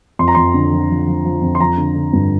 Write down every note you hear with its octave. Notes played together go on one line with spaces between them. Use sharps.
F2 C6
A#5
F2 C6
D3
F3
F3
F3
F3
F2
C6
F3 A#5
D3
D3
G2